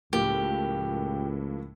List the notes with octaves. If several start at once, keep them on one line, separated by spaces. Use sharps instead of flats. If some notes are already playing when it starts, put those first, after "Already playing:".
C#2 A2 F3 A#3 G4